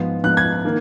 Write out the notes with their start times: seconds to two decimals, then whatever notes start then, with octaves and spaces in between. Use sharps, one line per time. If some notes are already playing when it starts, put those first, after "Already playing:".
Already playing: G#2 F3 B3
0.24 G#2 F3 B3 F#6
0.37 G#6
0.65 D#3 A#3